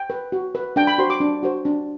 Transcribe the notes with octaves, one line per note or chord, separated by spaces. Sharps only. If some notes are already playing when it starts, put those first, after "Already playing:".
Already playing: G5
B4
F#4
B4
D4 G5
B5
F#4 C5 C6
D6
D4
F#4 C5
D4